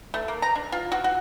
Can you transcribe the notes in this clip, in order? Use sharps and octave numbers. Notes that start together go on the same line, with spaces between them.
A3
A#3
A#5
D4
F4
F#4
F#4